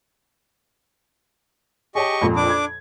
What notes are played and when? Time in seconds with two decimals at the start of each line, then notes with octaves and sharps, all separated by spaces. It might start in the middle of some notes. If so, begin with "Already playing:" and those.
1.95 G4 G#4 C#5 D#5 A5 C#6
2.22 F2 A#2
2.36 D4 D6
2.49 G#6